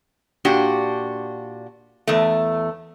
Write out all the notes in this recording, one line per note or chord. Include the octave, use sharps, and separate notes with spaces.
A#2 D4 F#4 G4
E2 A3